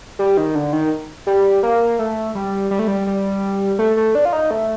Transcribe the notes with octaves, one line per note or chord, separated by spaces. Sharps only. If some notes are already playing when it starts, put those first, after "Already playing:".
G3
D#3
D3
D#3
G3
A#3
A3
G3
G3
A3
G3
G3
A3
A3
D4
F4
D#4
A3